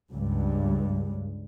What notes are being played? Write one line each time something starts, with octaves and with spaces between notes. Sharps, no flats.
C#2 G2